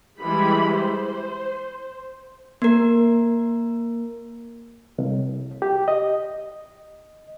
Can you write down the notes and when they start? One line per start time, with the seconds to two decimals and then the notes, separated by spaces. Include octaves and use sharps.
0.21 E3 G3 G#3 B5
0.75 C5
2.62 A#3 A#4
4.98 C2
5.62 G4
5.88 D#5